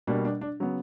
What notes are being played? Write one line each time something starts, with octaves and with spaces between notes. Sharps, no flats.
B2 G3 A#3 D4
D4
D4
C#3 F#3 B3